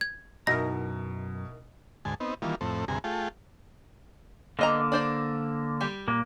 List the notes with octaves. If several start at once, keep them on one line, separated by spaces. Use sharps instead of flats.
G#6
F#2 B2 D#4 E4 A#4 A#5 A#6
D2 G#2 G#5 A5
B3 C4 D#4
D#3 E3 G3 A#3 F4
F2 A2 C4 A4
D2 G2 C3 G#4 G#5 A#5
A3 F4 G#4 G5 A5
D3 A#3 B3 D#5 A#5
D4 C5 D5
G3 G4
A#2 A#3